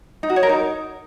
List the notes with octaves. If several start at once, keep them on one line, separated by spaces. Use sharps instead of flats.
D#4
F#4
C#5
A#4
D#4